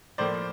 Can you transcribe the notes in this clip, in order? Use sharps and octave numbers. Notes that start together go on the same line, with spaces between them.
A2 F3 A#3 C5 D5